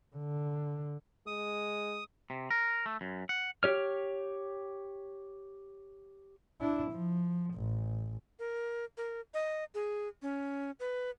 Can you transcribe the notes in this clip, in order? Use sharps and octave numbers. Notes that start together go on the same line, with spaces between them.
D3
G#3 D#6
C3
A#4
A3
F#2
F#5
G4 C#5 F6
D4 E4
F3
A1
A#4
A#4
D#5
G#4
C#4
B4